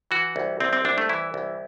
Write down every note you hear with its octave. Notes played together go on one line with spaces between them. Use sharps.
E3 F#4
C2
C2 C4
C4
C2 D4
A3
E3 E4
C2